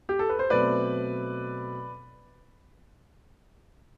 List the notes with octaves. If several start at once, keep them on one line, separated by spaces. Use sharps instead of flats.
G4
A4
B4
C5
B2 F#3 A3 C4 B4 D5